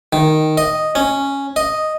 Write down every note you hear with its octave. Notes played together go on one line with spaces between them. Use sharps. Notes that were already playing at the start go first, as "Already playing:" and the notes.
D#3
D#5
C#4
D#5